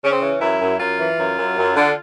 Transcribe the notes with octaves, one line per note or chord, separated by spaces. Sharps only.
C#3 C#4
C4
E3 C#4
F#2 E4
F#2
F#2 F4
E3
F#2
F#2
F#2
D3